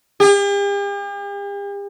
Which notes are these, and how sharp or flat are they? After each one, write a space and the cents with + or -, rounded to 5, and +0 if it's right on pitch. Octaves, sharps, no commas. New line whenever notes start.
G4 +45